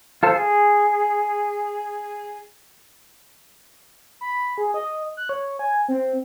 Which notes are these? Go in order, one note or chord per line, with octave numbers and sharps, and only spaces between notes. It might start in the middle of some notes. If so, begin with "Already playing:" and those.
F4 A4 C5
G#4
B5
G#4
D#5
F#6
C#5
G#5
C4